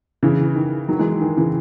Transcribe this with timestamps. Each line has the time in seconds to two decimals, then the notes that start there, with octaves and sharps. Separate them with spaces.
0.23 C#3 E3
0.56 D#3
0.88 D#3 F#3
0.99 E3 G#3
1.21 D#3
1.37 C#3 E3